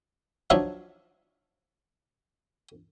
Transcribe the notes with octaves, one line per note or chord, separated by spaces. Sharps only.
F3 F#3 D4 D#4 C#5 E5